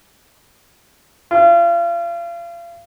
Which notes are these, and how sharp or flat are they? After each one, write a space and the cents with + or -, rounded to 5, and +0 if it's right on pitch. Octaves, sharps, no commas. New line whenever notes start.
F4 -35